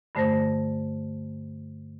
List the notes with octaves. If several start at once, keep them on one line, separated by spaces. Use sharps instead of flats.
G2 D3 A3 C5 A#6